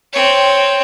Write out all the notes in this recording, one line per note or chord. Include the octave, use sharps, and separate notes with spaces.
C4 C#5